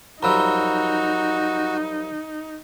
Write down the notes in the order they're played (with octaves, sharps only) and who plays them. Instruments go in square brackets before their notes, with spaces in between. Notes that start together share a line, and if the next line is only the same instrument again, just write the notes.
[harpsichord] F#2 F3 G3 [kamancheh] D#4 [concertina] F#4 [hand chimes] A#5 B5 E6